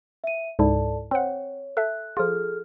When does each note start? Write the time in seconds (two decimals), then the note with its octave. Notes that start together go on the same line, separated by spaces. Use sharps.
0.24 E5 D#7
0.59 C#2 G#2 E4 A4 D5 A5
1.11 C4 C#5 F#5
1.77 A4 E5 F#6
2.17 F3 F4 G#4 A4 F6